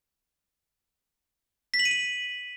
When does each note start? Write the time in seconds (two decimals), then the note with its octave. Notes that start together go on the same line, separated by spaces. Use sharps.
1.74 B6
1.79 F#7
1.85 D#7
1.91 F#7